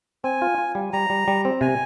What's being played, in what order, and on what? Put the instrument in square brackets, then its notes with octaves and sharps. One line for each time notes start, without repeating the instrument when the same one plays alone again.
[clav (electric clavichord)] C4 [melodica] G#5
[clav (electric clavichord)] F4
F4
G3
[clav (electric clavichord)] G3 [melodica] A#5
[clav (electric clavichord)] G3
G3
C4
[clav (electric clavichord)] C3 [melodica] G#5